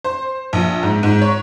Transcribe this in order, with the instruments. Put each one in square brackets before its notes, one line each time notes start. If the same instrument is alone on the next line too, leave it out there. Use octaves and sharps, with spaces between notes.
[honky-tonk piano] C5
A#1
G#2
G#2
C#5